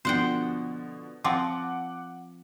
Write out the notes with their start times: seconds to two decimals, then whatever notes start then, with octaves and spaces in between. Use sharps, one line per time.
0.05 B2 D3 F3 C5 F#5 G5
1.24 F3 C4 F#5 D6